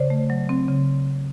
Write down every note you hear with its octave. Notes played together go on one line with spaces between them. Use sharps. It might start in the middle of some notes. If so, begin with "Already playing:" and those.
Already playing: C#3 C5 D5
A3
F#3
C4
C#3